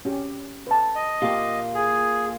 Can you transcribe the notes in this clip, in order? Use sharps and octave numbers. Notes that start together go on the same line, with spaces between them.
C#4 G4
B4 A5
D#5
A#3 F4 G4
G#4